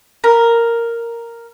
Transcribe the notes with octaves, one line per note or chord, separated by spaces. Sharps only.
A#4